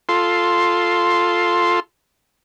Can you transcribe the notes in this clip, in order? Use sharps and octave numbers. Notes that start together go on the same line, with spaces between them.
F4 A4 C6